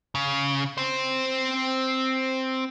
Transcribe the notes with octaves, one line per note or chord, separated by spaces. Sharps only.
C#3
C4 C5